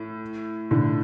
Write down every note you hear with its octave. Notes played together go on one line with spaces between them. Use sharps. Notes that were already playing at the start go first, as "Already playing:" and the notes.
Already playing: A2
A2 D3